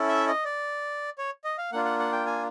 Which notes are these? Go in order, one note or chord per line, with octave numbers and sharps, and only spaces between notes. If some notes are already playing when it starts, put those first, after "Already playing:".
Already playing: C#4 E4 A4
E5
D#5
D5
C#5
D#5
F5
A#3 D4 F4 F#5
F#5
F#5
G5
G#5